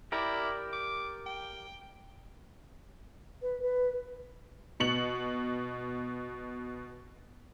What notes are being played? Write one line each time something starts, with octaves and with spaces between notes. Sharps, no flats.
E4 G4 A#4 D5
D6
G5
B4
B4
B2 C#7 F#7